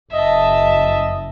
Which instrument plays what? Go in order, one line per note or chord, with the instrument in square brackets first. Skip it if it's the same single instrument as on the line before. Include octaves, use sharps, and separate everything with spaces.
[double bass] F#1 [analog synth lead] D#5 [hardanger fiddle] E5 A5